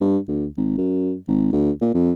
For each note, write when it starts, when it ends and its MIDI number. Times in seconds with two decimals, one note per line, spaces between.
0.01 0.18 43
0.28 0.46 38
0.57 0.75 32
0.77 1.14 42
1.28 1.50 32
1.52 1.71 38
1.81 1.92 46
1.94 2.12 41